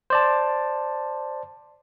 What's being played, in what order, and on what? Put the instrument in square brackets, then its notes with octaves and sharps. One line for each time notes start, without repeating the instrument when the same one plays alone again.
[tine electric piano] C5 D5 A5